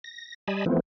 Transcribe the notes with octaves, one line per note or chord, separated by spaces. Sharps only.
A#6
G3 D#5 G#5 A5 B5
E3 F3 A3 B3 C4